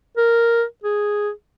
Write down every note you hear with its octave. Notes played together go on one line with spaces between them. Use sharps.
A#4
G#4